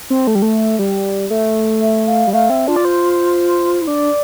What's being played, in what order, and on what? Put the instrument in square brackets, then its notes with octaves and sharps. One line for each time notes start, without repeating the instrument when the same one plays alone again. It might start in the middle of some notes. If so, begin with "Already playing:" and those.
[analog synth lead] C4
A3
G3
A3
G3
A3
[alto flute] E5
F5
[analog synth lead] G3
[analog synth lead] A3 [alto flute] F5
[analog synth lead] C4 [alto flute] E5
[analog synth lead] D4 [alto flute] F4
[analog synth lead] D5
C5
[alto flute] E4
[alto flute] D4 [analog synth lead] D5